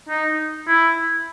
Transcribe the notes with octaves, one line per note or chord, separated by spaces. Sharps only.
D#4
E4